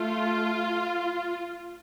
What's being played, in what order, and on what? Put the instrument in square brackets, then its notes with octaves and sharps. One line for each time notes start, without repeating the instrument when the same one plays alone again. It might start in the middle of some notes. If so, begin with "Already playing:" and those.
Already playing: [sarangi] A3 [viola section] F4